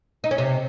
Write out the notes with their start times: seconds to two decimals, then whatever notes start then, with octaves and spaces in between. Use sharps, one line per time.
0.24 D#4
0.31 C#4
0.38 C3